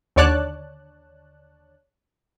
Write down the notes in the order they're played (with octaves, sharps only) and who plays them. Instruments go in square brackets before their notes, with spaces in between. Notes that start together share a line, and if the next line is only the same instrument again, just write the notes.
[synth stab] D#2 D3 C#5 D5 A5 F#6